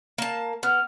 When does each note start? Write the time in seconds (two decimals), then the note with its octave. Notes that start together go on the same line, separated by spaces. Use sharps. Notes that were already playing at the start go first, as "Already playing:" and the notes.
0.18 A#3 A5
0.63 B3 F6